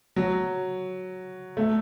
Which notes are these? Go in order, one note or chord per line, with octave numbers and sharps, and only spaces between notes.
F#3
A3